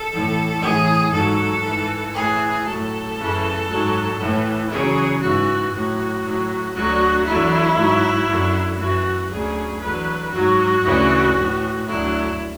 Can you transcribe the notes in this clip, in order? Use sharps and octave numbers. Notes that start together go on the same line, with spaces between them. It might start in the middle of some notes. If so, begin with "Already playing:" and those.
Already playing: A4
A2 E3
A2 E3 G#4
G#2 F#3 A4
G#2 E3
A2 E3 G#4
A2 F#3 A4
F#2 C#3 E3
G#2 F#3
A2 E3
E2 C#3 F#3 G#4
G#2 E3 F#4
A2 F#3 F#4
A2 F#3
D2 D3 F#3 F#4
E2 D3 F#3 E4
G#2 F#3
F#2 D3 F#3
F#2 E3 F#4
D2 C#3 F#3 G#4
E2 D3 F#3 B4
G#2 F#3 F#4
D2 C#3 E3
A2 E3
D2 D3 F#3 E4